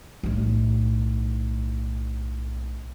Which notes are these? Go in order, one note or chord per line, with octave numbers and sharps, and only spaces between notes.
B1 A2